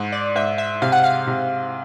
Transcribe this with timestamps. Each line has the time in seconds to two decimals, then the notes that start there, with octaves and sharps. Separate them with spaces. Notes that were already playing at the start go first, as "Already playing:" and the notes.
Already playing: G#2
0.12 D5
0.35 G#2 E5
0.58 E5
0.82 C3 F5
0.92 F#5
1.04 F5
1.27 C3